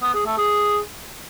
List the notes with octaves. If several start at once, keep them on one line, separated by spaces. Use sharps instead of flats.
B3
G#4
A3
G#4